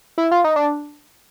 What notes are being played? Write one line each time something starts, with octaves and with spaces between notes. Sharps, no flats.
E4
F4
D#4
D4